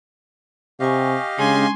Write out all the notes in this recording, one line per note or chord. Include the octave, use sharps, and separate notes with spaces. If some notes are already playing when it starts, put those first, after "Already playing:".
C3 G4 D#5 F5 G#5 C#6
C#3 G#3 C#4 D4 G#5 C6